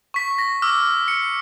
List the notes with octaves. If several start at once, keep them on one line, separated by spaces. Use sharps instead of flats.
C#6 B6
A#6
D6 E6 F6
C#7